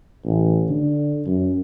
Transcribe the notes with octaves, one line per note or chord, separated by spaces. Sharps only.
A1
D3
F#2